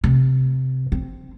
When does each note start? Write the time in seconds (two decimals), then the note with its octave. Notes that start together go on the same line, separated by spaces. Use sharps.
0.04 C3
0.92 C4